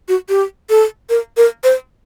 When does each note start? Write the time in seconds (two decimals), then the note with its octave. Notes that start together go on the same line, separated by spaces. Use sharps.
0.08 F#4
0.29 G4
0.70 A4
1.10 A#4
1.37 A#4
1.64 C5